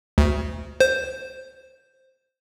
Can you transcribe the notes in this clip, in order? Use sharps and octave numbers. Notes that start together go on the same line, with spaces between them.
D2
C5